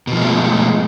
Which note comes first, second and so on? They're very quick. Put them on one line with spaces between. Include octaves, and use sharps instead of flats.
B2 F3 G#3 A3